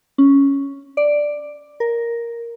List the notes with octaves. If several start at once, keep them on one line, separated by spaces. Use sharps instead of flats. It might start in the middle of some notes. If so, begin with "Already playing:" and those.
C#4
D5
A#4